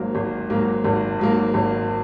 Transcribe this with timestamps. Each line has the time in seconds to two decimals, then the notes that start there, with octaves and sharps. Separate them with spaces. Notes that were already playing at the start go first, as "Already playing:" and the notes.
Already playing: G#1 G#2 F#3 A#3
0.15 G#1
0.50 G#2 F#3 A#3
0.84 G#1
1.19 G#2 F#3 A#3
1.54 G#1